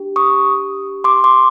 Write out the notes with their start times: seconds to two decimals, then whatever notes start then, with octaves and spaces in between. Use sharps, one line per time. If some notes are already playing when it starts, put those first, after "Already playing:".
Already playing: D4 G4
0.16 C#6 D#6
1.04 C6 D6
1.24 C6 D6